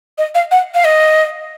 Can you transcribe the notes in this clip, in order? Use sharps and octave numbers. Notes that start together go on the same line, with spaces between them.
D#5
F5
F#5
F5
D#5